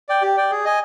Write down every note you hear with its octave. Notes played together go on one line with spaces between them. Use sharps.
D5 G5
G4
D5 G5
G#4
D#5 G#5